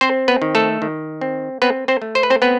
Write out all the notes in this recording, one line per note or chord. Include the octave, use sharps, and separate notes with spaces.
C4 C5
B3 B4
D#3
A3 A4
D#3
C4
B3 C4 B4
C4 C5
A3
C5
B4
C4 C5
B3 C4 B4